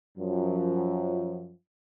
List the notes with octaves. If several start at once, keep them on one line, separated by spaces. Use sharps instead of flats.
F#2 F3